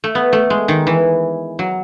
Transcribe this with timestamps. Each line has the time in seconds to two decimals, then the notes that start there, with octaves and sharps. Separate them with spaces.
0.04 A3
0.15 B3
0.33 A3
0.50 G#3
0.68 D#3
0.87 E3
1.59 F#3